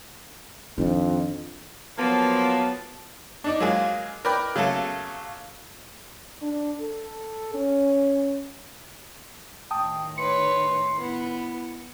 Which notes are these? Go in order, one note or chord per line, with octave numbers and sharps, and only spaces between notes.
F2 D#3 D4
F3 F#3 A#3 B3 A5
D4 D#4 D5
F#3 G#3 A#3 F4 G#4
A#4 B4 D5 G5 B5
C#3 F#3 A3 A#3 A4
D4
A4
C#4
A2 D#3 G5 A5 D#6
B4 C#5 C6 C#7
B3 E4